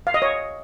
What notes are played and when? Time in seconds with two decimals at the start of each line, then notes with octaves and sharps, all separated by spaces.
0.07 F5
0.14 D#5
0.22 C#5